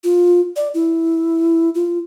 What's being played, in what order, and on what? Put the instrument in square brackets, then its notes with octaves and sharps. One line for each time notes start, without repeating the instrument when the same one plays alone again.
[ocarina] F4
D5
E4
F4